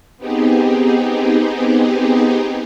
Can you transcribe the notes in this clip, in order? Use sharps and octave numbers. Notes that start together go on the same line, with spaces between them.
B3 C4 D#4 G4 G#4